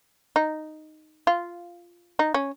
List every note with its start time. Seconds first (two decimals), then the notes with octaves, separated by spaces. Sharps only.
0.36 D#4
1.27 F4
2.19 D#4
2.34 C#4